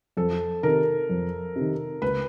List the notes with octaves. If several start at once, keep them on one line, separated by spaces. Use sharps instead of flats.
F2 A4
C3 D#3 A#4
F2
C3 D#3
C#2 B4